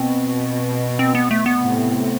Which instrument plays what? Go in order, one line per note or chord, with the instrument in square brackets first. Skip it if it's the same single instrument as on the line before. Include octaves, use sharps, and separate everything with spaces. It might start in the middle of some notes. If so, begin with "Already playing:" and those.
Already playing: [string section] B2 [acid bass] C4
[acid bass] C4
B3
A3
B3
[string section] A2 C3